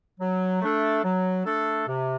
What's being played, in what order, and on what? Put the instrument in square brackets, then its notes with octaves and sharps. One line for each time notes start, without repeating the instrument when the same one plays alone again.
[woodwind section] F#3
A3 D4 A4
F#3
A3 D4 A4
C3